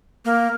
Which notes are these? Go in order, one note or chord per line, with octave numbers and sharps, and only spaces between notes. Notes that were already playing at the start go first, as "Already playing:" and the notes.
A#3